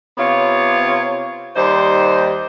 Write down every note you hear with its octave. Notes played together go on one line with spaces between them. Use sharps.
C3 B3 F4 C#5
D#2 G3 D#4 C5